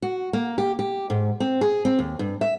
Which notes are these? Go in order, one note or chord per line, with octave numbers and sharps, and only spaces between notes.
F#4
A#3
G4
G4
G#2
C4
G#4
C4
D#2
G2
E5